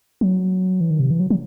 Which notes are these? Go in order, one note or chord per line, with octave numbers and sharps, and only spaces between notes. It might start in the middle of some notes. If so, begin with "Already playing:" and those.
F#3
E3
D#3
C3
E3
F#3
F#3